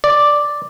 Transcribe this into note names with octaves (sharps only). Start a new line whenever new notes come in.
D5